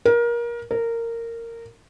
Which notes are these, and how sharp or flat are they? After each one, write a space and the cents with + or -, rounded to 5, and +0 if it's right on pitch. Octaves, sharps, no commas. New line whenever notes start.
A#4 +25
A#4 -15